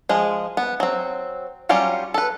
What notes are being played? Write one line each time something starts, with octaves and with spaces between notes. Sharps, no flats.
F3 G#3 G#4
B3
F#3 C4
F#3 G3 C#4 F4 G4
A4 B4